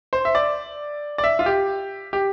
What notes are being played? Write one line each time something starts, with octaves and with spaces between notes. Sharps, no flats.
C5
E5
D5
D5
E5
F4
G4
G4